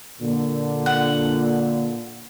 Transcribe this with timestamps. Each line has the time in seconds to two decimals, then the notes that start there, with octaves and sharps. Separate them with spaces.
0.21 A#2 D3
0.86 F#5